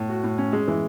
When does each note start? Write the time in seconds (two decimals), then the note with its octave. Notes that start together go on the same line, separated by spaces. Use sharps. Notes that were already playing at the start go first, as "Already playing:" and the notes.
Already playing: A2
0.09 F#4
0.24 A2
0.38 C#4
0.52 G#3
0.68 E3